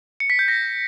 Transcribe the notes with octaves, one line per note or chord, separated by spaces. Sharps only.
C#7
B6
G6
A#6